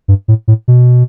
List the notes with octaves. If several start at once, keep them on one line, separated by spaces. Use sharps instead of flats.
G2
A2
A2
B2